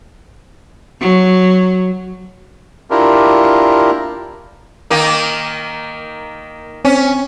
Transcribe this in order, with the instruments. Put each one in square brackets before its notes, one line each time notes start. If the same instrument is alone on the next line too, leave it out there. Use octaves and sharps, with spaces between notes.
[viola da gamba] F#3
[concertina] D4 E4 F4 G4 A#4
[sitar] D#3 A#3 D#4
[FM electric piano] C4 [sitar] C#4